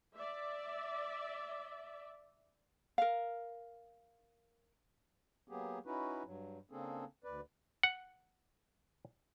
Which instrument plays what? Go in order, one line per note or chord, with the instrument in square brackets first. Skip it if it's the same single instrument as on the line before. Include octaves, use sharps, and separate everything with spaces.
[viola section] D5 E5
[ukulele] A#4 F5
[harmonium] F#3 A#3 B3 G4 G#4
C#4 D#4 E4 F#4 B4
G2 F#3
C#3 A#3 C4 D4 G#4 A4
D2 B4 D5
[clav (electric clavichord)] F#5